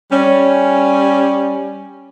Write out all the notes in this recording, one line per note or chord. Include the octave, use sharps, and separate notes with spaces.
G3 C#4